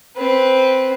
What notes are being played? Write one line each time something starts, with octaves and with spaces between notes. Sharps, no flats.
C4 B4